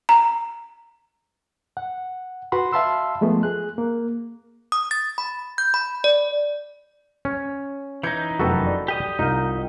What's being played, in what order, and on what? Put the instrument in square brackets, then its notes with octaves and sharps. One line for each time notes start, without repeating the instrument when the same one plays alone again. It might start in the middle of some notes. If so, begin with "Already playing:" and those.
[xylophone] A#5
[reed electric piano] F#5
F#4 B4 F#5 B5 C6
E5 F5 A5 B5 C6 E6
F3 G#3 A3 B3
G#4 F#6
A#3
[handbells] D#6
A6
B5
G6
B5
D5
[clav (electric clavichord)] C#4
[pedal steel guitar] E3 D#4 [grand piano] G6 G#6 C#7
[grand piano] F1 F#2 G5 [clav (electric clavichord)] F#4 A4 B4
[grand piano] D5
[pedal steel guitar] G4 D#5 D#6
[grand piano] C2 F4 F6 [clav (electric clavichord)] D#4